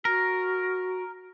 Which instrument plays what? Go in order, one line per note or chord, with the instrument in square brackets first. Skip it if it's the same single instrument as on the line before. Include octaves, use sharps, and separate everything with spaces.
[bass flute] F#4 [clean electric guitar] A#4